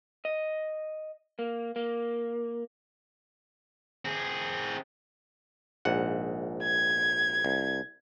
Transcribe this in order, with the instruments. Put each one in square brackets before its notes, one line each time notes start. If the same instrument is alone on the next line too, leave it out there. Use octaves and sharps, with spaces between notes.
[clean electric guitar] D#5
A#3
A#3
[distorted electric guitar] C4 G#4
[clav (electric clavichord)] A#1 G#2 F#5
[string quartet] G#6
[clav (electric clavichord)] C2